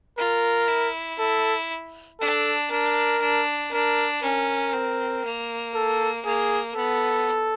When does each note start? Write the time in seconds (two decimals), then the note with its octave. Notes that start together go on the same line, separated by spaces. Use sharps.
0.18 F4 A#4
0.68 E4
1.19 E4 A4
2.20 D4 A4
2.71 D4 A#4
3.21 D4
3.72 D4 A#4
4.23 C#4 A#4
4.73 C4
5.24 A#3
5.75 A4
6.24 A#3 G#4
6.75 B3 A4